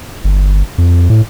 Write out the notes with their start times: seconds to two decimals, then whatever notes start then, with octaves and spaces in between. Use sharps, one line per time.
0.24 G1
0.78 F2
1.10 A2